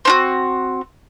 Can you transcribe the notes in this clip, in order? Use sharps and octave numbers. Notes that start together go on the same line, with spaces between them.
C4 D4 F#4